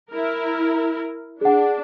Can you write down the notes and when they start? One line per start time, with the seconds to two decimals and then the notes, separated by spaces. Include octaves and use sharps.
0.11 E4 A#4
1.41 D4 G#4 F#5